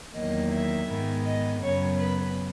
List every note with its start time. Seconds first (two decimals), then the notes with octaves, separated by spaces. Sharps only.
0.14 E2 D#3 F#3 A#3 D#5
0.51 E5
0.87 G#2 D#3 G#3 B3
1.24 D#5
1.62 F#2 C#3 F#3 B3 C#5
1.99 B4